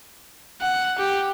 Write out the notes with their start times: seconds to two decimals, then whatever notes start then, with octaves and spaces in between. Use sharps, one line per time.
0.61 F#5
0.98 G4